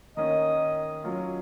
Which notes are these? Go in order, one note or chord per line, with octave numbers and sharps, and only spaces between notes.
D#3 A#3 C#4 D#5
F#3 C#4 F4